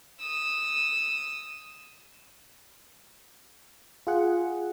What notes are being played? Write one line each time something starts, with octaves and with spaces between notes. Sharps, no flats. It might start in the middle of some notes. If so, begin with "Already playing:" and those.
D#6 E6
F4 G#4 F#5